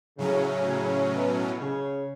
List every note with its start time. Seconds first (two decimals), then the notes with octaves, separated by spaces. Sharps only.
0.17 A2 C#3 F#3 C#4
0.65 C#3
1.12 B2
1.59 C#3